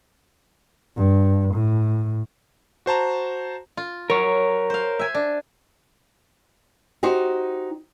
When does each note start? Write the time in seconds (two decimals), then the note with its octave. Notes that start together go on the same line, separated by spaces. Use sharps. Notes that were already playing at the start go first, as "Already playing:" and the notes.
0.96 G2
1.54 A2
2.86 F#4 C5 A5 A#5
3.77 F4
4.10 F#3 A#4 C#5
4.70 C5 F5
4.99 E5 G#5
5.15 D4
7.03 D#4 F#4 G4 C5